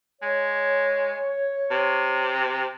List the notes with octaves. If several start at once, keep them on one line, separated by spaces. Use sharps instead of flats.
G#3 C#5
C3